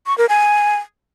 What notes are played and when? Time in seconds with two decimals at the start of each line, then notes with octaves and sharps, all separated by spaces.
0.07 C#6
0.18 A#4
0.29 G#5